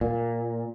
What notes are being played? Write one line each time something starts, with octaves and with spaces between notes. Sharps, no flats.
A#2